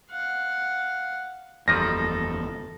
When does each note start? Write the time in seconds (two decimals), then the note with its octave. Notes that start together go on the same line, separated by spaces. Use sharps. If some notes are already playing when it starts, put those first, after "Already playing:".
0.10 F5 F#5
1.68 F#1 E2 D#3 F3 G3 A4 A#6